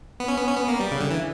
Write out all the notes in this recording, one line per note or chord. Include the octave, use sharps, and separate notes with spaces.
B3
C#4
B3
C#4
B3
A#3
G3
C#3
D3
E3